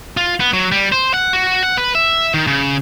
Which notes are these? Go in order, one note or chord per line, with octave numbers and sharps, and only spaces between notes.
F4
B3
F#3
G3
C5
F#5
F#4
F#5
B4
E5
D#3
C#3